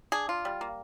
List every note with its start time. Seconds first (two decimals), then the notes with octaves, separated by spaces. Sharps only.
0.12 D4 G#4
0.29 F4
0.45 G3
0.61 A#3